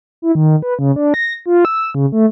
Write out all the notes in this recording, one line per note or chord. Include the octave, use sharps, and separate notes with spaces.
E4
D#3
B4
C#3
D4
A#6
F4
E6
C#3
A3